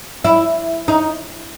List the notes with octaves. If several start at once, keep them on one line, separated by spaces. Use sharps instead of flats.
E4
D#4